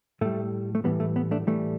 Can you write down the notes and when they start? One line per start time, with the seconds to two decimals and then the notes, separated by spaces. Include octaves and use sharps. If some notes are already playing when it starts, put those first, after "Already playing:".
0.21 A2 G3 A3
0.75 A3
0.84 A2 E3 G3 B3
1.00 A3
1.16 B3
1.31 A3 D4
1.47 A2 E3 G3 A3